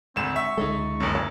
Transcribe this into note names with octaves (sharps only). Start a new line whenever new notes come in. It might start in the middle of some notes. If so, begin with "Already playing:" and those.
G#1 D2 G#3 C4 E7
E5 C#6
C#2 D3 G#3 D#4 G#4 A4
F#1 F#2
C#5 A5